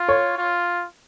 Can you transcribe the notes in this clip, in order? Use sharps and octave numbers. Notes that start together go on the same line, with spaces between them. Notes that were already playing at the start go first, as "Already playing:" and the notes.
Already playing: F4
C#5
F4